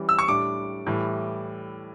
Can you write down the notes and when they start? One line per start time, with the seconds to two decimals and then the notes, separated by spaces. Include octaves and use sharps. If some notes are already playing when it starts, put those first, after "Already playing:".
Already playing: E3 G3 C#4
0.09 E6
0.19 C#6
0.28 A2 G3 D4 D6
0.86 A2 E3 G3